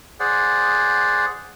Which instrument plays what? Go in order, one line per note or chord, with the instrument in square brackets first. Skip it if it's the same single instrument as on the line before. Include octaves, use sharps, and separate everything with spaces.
[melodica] G#4 C5 D5 F#5